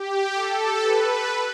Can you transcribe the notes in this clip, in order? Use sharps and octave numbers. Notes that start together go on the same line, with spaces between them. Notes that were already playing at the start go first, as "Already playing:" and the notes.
Already playing: G4
A4
B4